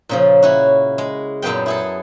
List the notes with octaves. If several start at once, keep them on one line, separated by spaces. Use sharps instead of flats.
A#2 C#3 F3
C#4 E4 F#4
G#3
F#2 A#2 A#3 B3 G5
E4 G#4 A4